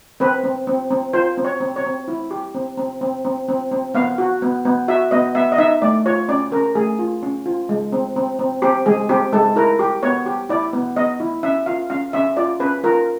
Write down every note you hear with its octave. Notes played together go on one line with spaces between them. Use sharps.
C4 B4
C4
C4
C4
F4 C5
C4
C#5
C4
C#5
C4
E4
G4
C4
C4
C4
C4
C4
C4
B3 F5
F#4
B3
B3
F#4 E5
B3 D#5
B3 E5
D#5
D#4 E5
A3 D5
F4 C#5
C#4 D5
C#4 A#4
A3 G#4
F4
C#4
F4
G#3
C4
C4
C4
C4 G4
G#3 G#4
C4 G4
G#3 A4
E4 A#4
G4
B3 C#5
G4
E4 D5
B3
B3 D#5
E4
C#4 E5
F4 F5
C#4 F5
C#4 E5
F4 D5
C#4 B4
F4 A#4